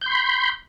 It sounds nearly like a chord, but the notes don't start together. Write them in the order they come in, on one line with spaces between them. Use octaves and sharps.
G6 C6 B5